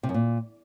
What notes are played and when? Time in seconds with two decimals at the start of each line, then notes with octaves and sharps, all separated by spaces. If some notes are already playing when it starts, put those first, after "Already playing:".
0.03 C3
0.09 F#2
0.14 A#2